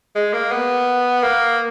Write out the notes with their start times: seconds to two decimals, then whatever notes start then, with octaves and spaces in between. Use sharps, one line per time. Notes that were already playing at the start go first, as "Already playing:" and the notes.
0.16 G#3
0.33 A#3
0.51 B3
1.23 A#3